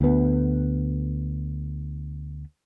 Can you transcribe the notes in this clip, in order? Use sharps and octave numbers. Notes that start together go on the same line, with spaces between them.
D2 B3